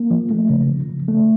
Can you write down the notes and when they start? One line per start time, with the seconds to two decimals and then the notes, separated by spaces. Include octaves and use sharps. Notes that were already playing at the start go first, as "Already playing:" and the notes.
Already playing: A#3
0.11 F3
0.31 A3
0.50 C#3
0.69 F3
0.89 C#3
1.08 A3